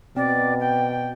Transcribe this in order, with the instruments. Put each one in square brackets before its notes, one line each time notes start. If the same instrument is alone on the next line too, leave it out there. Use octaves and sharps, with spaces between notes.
[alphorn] B2 [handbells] C4 [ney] D5
[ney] G5